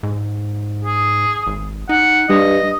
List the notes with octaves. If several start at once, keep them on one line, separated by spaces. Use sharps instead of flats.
G#2
G#4
G#1
D#4 F#5
G2 G3 D#5